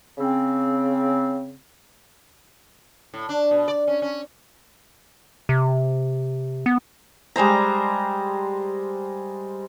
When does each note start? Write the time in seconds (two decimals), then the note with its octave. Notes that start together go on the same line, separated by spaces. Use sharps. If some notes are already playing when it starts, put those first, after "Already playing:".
0.18 C#3 C4
3.14 A2
3.29 D4
3.51 B2
3.68 D5
3.87 C#4
4.02 C#4
5.49 C3
6.66 B3
7.36 G3 G#3 C5 A#5